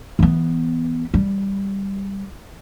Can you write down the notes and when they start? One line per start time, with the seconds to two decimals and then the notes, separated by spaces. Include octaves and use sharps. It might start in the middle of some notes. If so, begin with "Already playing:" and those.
0.19 E3 B3
1.14 G3